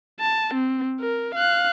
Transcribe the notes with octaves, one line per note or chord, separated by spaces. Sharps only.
A5
C4
A#4
F5 F#6